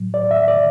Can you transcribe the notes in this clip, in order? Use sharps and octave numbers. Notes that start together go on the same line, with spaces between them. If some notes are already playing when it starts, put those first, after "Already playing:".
Already playing: A2 F#3
D5
E5
D5